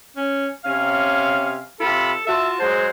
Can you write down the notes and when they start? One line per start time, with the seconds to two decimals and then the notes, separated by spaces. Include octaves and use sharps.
0.16 C#4
0.64 C3 C#4 F5
1.80 C3 F4 A4 B5
2.27 F4 F#4 E5 A5
2.59 F#3 G#3 C5